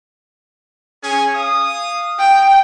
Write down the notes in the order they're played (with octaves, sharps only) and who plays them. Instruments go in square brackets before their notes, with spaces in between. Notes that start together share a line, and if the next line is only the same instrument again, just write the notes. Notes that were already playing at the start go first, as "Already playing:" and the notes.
[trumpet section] C#4 G#4 G#5
F5 D#6
[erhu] G5